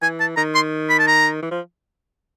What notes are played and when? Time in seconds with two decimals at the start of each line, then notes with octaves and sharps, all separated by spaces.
0.02 E3 G#5
0.20 A5
0.37 D#3 A#5
0.55 C6
0.89 B5
0.99 A5
1.07 A#5
1.42 E3
1.51 F3